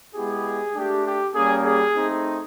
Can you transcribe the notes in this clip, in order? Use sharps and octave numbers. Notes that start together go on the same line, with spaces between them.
G#3 B3 E4 G4 G#4
A3 D4 G4
G4
G3 A#3 C#4 G#4
G#4
A3 C4 D#4